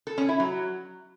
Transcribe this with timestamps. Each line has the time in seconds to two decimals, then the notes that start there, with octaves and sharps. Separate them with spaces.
0.07 A4
0.18 C#4
0.29 E4
0.40 F#3